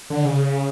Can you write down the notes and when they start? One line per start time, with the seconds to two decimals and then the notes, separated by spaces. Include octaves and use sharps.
0.10 D3
0.25 C#3